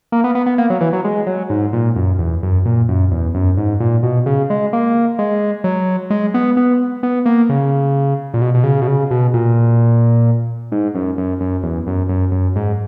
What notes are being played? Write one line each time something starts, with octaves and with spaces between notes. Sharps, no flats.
A#3
B3
B3
B3
A#3
F#3
E3
F#3
G#3
F#3
G#2
A#2
F#2
E2
F#2
A#2
F#2
E2
F#2
G#2
A#2
B2
C#3
G#3
A#3
G#3
F#3
G#3
B3
B3
B3
A#3
C#3
A#2
B2
B2
C#3
B2
C#3
B2
A#2
G#2
F#2
F#2
F#2
E2
F#2
F#2
F#2
G#2